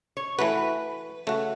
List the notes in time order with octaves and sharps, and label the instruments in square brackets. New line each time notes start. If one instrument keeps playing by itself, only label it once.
[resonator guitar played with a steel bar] C#5
[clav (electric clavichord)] E3 A3 F#4 [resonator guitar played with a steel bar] B4
[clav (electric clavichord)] C#3 A3 F#4